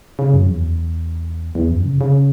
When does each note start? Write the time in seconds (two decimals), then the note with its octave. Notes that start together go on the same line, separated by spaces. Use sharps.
0.19 C#3
0.34 F#2
0.50 E2
1.55 E2
1.71 F#2
1.85 C#3
2.01 C#3